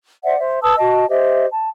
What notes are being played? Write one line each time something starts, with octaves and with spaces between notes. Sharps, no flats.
C5 D5 E5 F#5
C5 E5
B4 A5 D#6 E6
F#4 D#5 A5
G4 C5 D#5 E5
A5